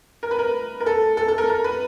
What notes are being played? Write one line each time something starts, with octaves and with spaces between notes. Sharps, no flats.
A#4
B4
A#4
A#4
A4
A4
A4
A#4
A#4
B4